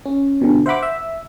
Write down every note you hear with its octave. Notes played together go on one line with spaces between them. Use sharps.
C#4
B2 D3
C5 E5 F#5 B5 D6
E5